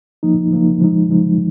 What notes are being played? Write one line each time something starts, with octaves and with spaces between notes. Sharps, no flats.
F3 A#3 D#4
F3 A#3 D#4
F3 G#3 D#4
F3 G#3 D#4